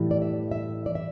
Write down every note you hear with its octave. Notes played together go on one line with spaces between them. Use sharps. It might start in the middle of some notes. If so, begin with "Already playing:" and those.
Already playing: A2 E3 G3
D5
E5
E5
D5
E5